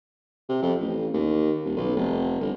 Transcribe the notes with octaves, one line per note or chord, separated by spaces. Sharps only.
C3
F2
A1
D#2
D#1
B1
F1
G1